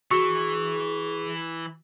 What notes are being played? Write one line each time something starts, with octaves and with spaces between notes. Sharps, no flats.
E3 F#4 G#4 C#6